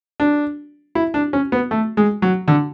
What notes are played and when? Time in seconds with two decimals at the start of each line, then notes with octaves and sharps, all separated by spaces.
0.20 D4
0.95 E4
1.14 D4
1.33 C#4
1.52 B3
1.71 A3
1.97 G#3
2.22 F#3
2.48 D3